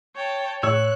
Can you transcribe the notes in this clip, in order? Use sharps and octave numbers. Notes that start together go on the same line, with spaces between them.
C#5 G5 A5
A2 C#5 E6 F#6